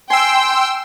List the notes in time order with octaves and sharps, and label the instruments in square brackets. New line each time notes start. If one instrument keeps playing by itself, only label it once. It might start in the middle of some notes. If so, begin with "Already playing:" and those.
[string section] G5 [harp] G#5 [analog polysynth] C6 E6